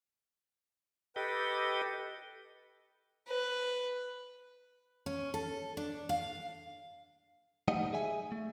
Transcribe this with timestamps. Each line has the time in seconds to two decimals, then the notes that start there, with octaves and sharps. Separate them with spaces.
1.16 G4 A4 B4 D#5 G5
3.28 B4
5.06 C#4
5.34 A4
5.77 D4
6.09 F5
7.68 G3 A3 D#4 D#5 F5 F#5
7.93 G#4 E5 G#5
8.32 A3